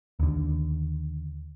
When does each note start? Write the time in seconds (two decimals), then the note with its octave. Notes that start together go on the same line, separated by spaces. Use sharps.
0.20 D#2 D3